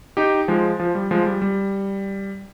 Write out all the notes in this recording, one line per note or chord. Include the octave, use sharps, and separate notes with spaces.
D#4 G4
F3 G#3
F3
G3
F3 G#3
G3
G3